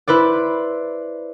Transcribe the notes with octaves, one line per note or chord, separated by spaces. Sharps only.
E4 B4 C5 D5